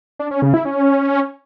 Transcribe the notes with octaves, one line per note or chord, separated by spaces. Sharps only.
D4
C#4
C#3
E4
C#4